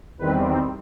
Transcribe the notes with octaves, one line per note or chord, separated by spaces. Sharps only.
E2 D#3 G3 C4 B4